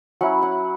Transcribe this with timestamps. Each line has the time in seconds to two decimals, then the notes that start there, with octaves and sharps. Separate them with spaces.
0.21 F#3 C#4 E4 F#5
0.42 F#5